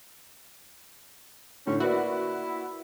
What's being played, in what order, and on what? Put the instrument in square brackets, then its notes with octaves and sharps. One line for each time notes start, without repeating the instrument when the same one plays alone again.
[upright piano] A2 D3 [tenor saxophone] C#4
[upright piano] A#3 B4 D5 [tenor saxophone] E4 [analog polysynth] F#4